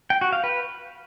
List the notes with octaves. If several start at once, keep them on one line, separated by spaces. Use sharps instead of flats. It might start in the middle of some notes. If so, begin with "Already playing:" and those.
G5
F#4
F5
B4